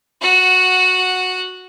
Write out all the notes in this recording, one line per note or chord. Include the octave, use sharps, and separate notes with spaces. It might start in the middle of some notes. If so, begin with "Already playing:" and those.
F#4 F#5